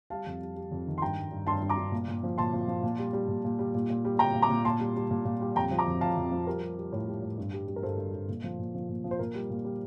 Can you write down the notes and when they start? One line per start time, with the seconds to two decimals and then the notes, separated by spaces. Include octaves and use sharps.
0.10 G3 F5 A5
0.26 F2
0.41 G3
0.56 G3
0.71 F2
0.87 D#3
0.98 C6
1.02 G2 G5 A#5
1.17 G2
1.32 G2
1.47 G2 A5 C6
1.62 G2
1.70 A#5 D6
1.78 G2
1.92 A#2
2.08 A#2
2.23 F3
2.38 A#2 A5 C6
2.53 F3
2.68 F3
2.83 A#2
2.98 G3
3.13 G3
3.28 A#2
3.45 A#2
3.59 G3
3.75 A#2
3.90 A#2
4.05 G3
4.19 G3 G5 A#5
4.35 A#2
4.43 A#5 D6
4.50 A#2
4.65 A#2 A5 C6
4.80 G3
4.96 G3
5.11 A#2
5.25 A#2
5.41 G3
5.56 F2 G5 A#5
5.71 F3
5.79 A#5 D6
5.87 F2
6.01 F2 F5 A5
6.17 F2
6.32 F3
6.47 G3 A#4
6.62 G3
6.78 G3
6.92 A2
7.07 G3
7.22 A2
7.38 G2
7.53 G3
7.67 G3
7.76 A#4
7.83 G2 A4 C5
7.98 G2
8.14 G2
8.29 A#2
8.44 F3
8.59 A#2
8.75 F3
8.89 A#2
9.04 F3
9.11 C5
9.19 A#2 A#4
9.35 G3
9.50 A#2
9.65 G3